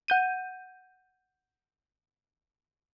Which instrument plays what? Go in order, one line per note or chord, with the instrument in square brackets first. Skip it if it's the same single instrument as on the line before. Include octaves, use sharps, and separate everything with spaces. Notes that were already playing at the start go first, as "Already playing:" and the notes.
[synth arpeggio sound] F#5 G6 D#7